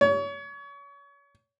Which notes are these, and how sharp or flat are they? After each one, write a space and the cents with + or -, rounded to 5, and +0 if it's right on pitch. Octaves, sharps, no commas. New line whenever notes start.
C#5 +30